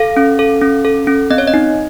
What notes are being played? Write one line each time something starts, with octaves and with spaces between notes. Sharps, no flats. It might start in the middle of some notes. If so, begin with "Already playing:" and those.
Already playing: A4 F5
C#4
A4
C#4
A4
C#4
C4 D#5
C#5
D#5
D#4